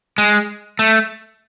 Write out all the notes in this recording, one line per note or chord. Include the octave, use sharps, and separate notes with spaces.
G#3
A3